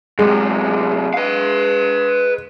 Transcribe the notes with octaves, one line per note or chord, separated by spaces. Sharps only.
F#2 C3 G#3
B4 F5